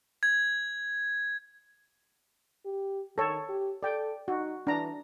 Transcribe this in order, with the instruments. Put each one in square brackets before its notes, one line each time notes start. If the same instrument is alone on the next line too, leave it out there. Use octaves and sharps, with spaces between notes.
[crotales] G#6
[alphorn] G4
[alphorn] D#3 [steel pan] A4 C#5
[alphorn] G4
[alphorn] A4 [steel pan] D5 G5
[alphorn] D#4 [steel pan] F#4
[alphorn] E3 [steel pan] D4 A#5